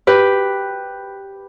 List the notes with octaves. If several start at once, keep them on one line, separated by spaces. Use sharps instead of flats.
G4 B4